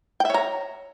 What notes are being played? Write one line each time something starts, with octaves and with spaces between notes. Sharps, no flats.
C#5 E5 G5 A#5